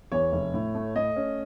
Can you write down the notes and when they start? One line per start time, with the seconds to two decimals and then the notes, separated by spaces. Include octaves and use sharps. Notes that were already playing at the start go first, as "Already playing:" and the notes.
0.12 E2 C#5
0.32 F1
0.54 A2
0.75 A3
0.96 A3 D#5
1.16 C#4